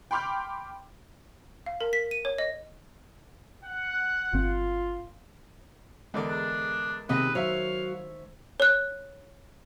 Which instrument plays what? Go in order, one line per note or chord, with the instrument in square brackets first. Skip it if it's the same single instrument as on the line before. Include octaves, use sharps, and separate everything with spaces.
[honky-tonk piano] G5 B5 C6 D6 F6 G6
[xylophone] F5
A#4
B6
D#7
C#5
D#5
[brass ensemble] F#5
[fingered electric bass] G1 C4 [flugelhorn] F4
[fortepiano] E2 D3 D5 [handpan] G#3 A#4
[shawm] D4
[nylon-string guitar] C3 [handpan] D#3 [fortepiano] G#3 D#5 [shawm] B4
[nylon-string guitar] F#3 [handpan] C5 [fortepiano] C#5 E5 [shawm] F5
[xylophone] C#5 F#6